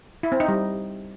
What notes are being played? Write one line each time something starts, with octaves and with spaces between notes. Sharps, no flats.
E4
C4
D#4
G3